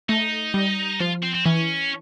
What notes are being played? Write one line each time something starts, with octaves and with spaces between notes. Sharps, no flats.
A3 D#4
G3
F3 F4
C4
C4
E3 C#4